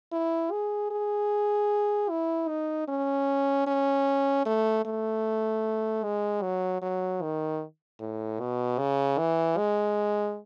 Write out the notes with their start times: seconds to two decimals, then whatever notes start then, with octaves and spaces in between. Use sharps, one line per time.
0.12 E4
0.51 G#4
0.91 G#4
2.10 E4
2.48 D#4
2.88 C#4
3.67 C#4
4.46 A3
4.85 A3
6.03 G#3
6.42 F#3
6.82 F#3
7.22 D#3
7.99 A2
8.39 B2
8.78 C#3
9.18 E3
9.57 G#3